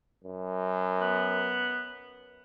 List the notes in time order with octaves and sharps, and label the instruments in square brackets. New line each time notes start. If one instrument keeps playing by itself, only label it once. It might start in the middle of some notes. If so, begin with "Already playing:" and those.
[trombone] F#2
[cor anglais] B3